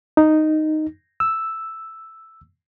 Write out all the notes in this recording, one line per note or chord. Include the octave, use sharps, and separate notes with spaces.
D#4
E6